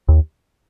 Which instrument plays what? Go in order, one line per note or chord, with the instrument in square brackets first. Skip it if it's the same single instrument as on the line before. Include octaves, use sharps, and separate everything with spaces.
[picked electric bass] D#2